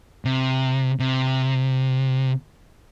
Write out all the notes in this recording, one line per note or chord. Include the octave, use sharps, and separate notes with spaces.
C3
C3